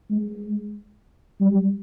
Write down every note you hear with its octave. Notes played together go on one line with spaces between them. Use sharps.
G#3
G3